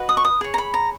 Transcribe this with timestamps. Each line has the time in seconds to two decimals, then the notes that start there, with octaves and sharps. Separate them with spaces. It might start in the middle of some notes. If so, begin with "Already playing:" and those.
Already playing: F#4 B4 D#5
0.09 D#6
0.17 C#6
0.25 D#6
0.41 G#4 C#5
0.54 A#5
0.58 B5
0.74 A#5